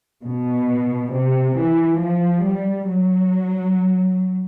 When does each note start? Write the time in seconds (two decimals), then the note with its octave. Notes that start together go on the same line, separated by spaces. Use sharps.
0.24 B2
1.12 C3
1.56 E3
1.99 F3
2.43 G3
2.88 F#3